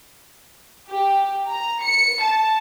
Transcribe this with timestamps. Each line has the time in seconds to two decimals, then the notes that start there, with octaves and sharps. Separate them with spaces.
0.88 G4
1.49 A#5
1.84 C#7
2.24 A5